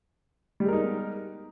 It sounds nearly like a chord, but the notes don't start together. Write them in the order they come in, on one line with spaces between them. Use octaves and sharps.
G3 G#3 A#4 D#4 B3